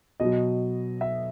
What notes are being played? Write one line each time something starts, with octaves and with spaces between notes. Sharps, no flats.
B2 F#3 D#5
E5